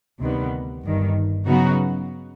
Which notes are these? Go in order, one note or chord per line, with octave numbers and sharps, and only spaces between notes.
D2 C3 D#3 G3 B3
G1 G2 D#3
C#3 F#3 B3 D#4 F#4